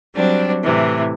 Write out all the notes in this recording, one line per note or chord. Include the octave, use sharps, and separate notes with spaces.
F#3 G3 C4 D4
A2 C3 E3